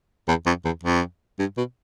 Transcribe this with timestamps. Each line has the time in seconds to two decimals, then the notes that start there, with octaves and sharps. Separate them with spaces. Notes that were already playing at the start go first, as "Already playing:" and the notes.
0.28 E2
0.46 F2
0.65 E2
0.83 F2
1.39 G2
1.57 B2